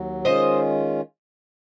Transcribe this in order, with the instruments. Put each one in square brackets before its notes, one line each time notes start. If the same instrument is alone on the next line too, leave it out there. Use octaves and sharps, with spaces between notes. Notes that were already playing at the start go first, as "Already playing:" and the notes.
Already playing: [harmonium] D#2 F#3
[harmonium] D#3 G#3 C#4 F4 [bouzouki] C5 D#5